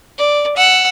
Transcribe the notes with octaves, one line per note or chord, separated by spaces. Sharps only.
D5
F#5 E6